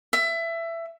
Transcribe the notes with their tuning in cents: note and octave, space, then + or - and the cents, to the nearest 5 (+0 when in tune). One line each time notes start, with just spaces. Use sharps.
E5 +20